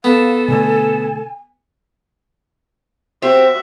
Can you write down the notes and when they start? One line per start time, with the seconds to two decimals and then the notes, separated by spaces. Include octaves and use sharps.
0.04 B3 A4 F5
0.48 B2 D3 A3 G#5
3.22 C4 F#4 G4 E5